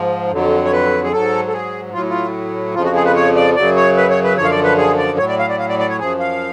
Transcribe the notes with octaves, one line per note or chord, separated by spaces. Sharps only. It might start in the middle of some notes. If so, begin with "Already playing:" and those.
Already playing: G#2 F3
F2 D3 F#3
C#5
B4
G#4
G#2 F#3 A4
A4
G#4
A2 F#3 F4
F4
F2 C#3 F3 F4
F#4
G#4
B4
C#5
D5
F#2 C#3 F#3 D5
C#5
B4
C#5
B4
F#2 D3 F3 C#5
F5
D5
B4
G#4
D5
A2 F#3 C#5
D5
F5
D5
F5
D5
D5
C#5
F#2 F3 G#4
F5